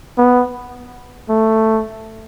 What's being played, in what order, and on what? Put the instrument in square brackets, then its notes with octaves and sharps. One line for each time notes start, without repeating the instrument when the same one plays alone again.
[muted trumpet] B3
A3